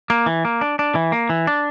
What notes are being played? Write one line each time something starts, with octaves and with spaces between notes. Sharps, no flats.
A#3
E3
A#3
D4
D4
E3
A#3
E3
D4